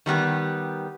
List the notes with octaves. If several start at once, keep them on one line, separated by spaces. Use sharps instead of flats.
D#3 G3 B3 G4